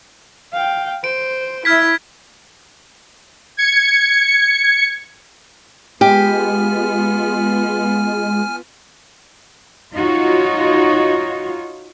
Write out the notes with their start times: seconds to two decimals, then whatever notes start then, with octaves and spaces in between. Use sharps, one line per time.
0.53 F5 G5
1.04 C5 D7
1.65 E4 E5 F6 G#6 B6
3.57 G#6 C#7
6.01 G#3 B3 F4 G4 G#5 F6
9.95 D#4 F4 F#4 C#5